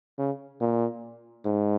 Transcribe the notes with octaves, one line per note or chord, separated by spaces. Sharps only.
C#3
A#2
G#2